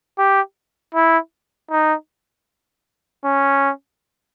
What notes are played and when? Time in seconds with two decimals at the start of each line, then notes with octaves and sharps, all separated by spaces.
0.18 G4
0.95 E4
1.71 D#4
3.24 C#4